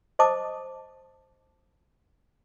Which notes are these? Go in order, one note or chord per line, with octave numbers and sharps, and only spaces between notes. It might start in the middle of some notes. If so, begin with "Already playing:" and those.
C5 D#5 A5 D6 D#6